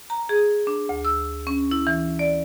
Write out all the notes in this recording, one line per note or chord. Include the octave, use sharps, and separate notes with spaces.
A#5
G#4
D4
D2
E6
C#4
E4
E3
D5